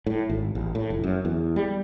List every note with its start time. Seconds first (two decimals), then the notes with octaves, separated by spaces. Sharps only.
0.06 A2
0.30 G#1
0.55 A1
0.75 A2
0.90 F1
1.04 F#2
1.25 E2
1.56 G3